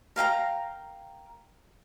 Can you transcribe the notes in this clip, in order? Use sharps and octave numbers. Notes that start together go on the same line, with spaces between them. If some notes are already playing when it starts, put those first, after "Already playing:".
A#4 F5 G5 A#5